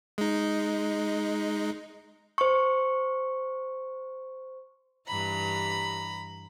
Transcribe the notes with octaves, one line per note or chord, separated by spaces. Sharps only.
G#3 D#4
C5 C#6
G2 E3 A#5 B5